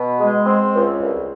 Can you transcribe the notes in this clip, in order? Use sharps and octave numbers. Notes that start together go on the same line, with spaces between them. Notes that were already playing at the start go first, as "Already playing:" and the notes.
Already playing: B2
G#3
C4
C#2
C2